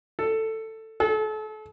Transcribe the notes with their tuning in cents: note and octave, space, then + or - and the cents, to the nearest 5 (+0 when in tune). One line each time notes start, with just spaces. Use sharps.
A4 +10
A4 -35